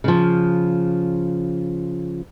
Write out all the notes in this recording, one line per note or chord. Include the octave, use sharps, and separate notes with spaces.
C#3 F3